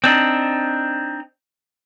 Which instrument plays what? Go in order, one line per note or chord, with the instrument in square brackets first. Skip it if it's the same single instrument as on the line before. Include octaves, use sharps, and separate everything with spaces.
[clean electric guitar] C4 D4 D#4